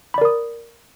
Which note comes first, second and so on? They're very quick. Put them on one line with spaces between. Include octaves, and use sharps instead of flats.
B5 D5 A#4 D#6